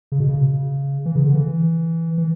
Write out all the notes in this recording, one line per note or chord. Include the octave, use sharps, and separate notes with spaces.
C#3
B2
C#3
E3
C#3
D3
E3
E3